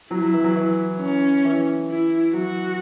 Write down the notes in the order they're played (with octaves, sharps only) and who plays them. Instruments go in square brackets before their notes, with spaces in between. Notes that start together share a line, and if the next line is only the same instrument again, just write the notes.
[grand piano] F#3 [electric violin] E4
[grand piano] F#3
E3
F#3
E3
[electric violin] C#4
[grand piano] E3
[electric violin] E4
[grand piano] F#3 [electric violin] F#4